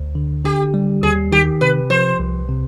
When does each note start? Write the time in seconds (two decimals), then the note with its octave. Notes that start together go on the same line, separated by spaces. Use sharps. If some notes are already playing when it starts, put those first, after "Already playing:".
Already playing: D2
0.15 D3
0.45 D3 G4
0.74 G3
1.03 D#2 G#4
1.32 D#3 G4
1.61 C3 B4
1.90 F3 C5
2.19 C2
2.49 C3